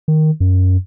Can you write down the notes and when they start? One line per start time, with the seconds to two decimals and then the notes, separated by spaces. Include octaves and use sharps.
0.08 D#3
0.40 F#2